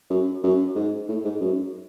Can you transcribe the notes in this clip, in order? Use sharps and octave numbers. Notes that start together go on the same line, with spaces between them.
F#2
F#2
G#2
A2
G#2
F#2